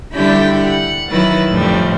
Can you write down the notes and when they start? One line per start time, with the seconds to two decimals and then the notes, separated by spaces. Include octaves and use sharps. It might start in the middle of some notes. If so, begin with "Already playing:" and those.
0.13 D3 G3 E4 G4 G5 B5
0.63 F#5
1.09 D#3 F#3 E4 B4 A6
1.49 F2 A2 D3 F3 G3